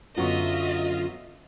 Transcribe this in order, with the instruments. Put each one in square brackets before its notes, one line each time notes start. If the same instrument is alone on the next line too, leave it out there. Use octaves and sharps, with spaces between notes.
[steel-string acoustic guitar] F#2 D3 [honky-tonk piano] F#3 B3 C#6 [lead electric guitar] F4 [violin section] D#5 E5